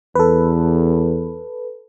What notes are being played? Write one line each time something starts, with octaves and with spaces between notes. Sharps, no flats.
E2 A4 B4